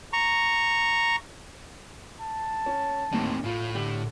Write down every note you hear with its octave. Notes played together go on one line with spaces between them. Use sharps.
A#5 C#6
A5
C#4
D#2 A2 A#3 C4 D#4
A2 F4
D3 G4 F#7